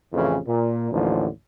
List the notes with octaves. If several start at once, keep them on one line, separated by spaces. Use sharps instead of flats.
A1 F2 C#3 E3 C#4
A#2
A1 D#2 A2 D3 F3